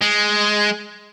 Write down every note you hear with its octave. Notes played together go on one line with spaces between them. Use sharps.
G#3